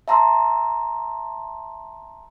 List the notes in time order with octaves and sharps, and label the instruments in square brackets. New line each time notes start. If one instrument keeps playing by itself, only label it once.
[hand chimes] E5 A5 A#5 C6 E6